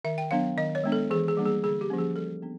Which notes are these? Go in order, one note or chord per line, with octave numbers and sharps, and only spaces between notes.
D#3 E5
G5
F#3 B3 D4 F5
D#3 D#5
C#5
G#3 B3 D4
A4
E3 G#4
G#4
G3 A#3 D4
G#4
D3 G#4
G4
F3 A#3 C#4
G#4
G3 A4
B3 D4